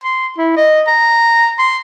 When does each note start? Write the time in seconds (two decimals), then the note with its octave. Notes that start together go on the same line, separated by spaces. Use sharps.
0.04 C6
0.38 E4
0.57 D#5
0.87 A#5
1.59 C6